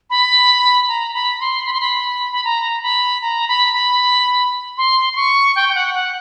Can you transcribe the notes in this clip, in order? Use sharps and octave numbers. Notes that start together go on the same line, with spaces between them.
B5
A#5
B5
C6
B5
C6
B5
B5
A#5
B5
A#5
B5
B5
C6
C6
C#6
G5
G5
F#5
F#5